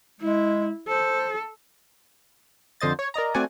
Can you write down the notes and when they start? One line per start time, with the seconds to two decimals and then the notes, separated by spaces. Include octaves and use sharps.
0.21 G#3 E4
0.88 A4 C5
2.81 F2 D3 C5 D#5 A6
2.99 C#5
3.14 A#4 D5 D#5 A#5
3.34 A3 C4 F#4 D5 F#5 G#5